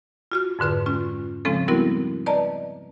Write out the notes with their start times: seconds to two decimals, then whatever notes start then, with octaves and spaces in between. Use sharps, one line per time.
0.32 F4 F#4 F6
0.59 F2 G#2 D3 B4 F6
0.86 G#3 C#4 F4
1.45 C#3 F3 G#3 C4 C#4 A4
1.68 G3 B3 C4 E4 F#4 A#4
2.26 B4 D5 D#5 A5 A#5